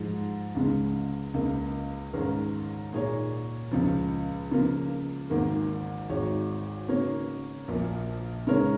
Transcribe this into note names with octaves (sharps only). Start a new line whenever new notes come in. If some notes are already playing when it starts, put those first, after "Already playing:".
Already playing: G#2 F3 G#3
C#2 C#3 G#3
C#2 C#3 A#3
G#2 D#3 G#3 C#4 A#4
A#2 A#3 D#4 G#4 C#5
C#2 C#3 F3
C#3 F3 A#3 F4
G#1 G#2 D#3 A#3
G#1 G#2 G#3 D#4 C#5
C#3 A#3 D#4 A#4 C#5
A#1 A#2 A#3
C#3 G#3 D#4 A#4 C#5